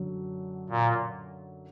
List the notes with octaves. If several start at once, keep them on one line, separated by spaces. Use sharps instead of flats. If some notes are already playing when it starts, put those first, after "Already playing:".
Already playing: F#2 D3 F#3
A#2